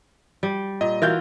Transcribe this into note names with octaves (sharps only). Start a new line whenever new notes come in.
G3
A#2 D#5
E3 F4 F#4 A#4 G6